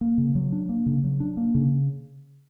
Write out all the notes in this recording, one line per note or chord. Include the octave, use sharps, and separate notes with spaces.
A#3
C#3
F#3
D4
A#3
C#3
F#3
D4
A#3
C#3